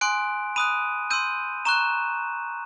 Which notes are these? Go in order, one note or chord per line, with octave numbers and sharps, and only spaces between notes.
G#5 C6 D#6 F#6 D7
B5 D#6 F#6 D#7
C6 E6 G6 D#7
A#5 C#6 F#6 E7